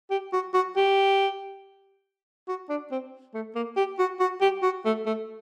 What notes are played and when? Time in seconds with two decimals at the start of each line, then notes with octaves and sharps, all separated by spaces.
0.11 G4
0.33 F#4
0.54 F#4
0.76 G4
2.48 F#4
2.69 D4
2.91 C4
3.34 A3
3.55 A#3
3.77 G4
3.99 F#4
4.20 F#4
4.41 G4
4.63 F#4
4.85 A3
5.06 A3